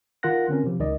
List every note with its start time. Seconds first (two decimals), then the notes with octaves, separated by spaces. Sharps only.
0.23 D#3 F4 A#4 F#5 F#6 A#6
0.49 D3 C4 C#4 A#4
0.64 C3 F3
0.80 C#2 D#3 D5 D#5